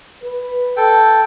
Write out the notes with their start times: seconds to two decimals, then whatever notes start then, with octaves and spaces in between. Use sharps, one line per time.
0.23 B4
0.77 A4 G5